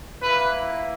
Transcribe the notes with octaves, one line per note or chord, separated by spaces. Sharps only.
A#3 E4 B4